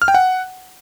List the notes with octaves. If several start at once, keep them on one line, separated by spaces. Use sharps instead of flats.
F6
G5
F#5